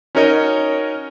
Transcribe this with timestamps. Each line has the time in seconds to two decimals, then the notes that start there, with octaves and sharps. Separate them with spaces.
0.15 C#4 D#4 F#4 A#4 C#5 D#5